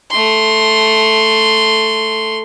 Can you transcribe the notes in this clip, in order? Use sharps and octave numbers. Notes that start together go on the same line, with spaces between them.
A3 C6